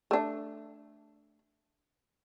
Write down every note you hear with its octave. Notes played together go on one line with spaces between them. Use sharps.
A3 D4